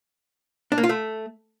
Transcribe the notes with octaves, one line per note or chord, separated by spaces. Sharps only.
D4
A#3
F4
A3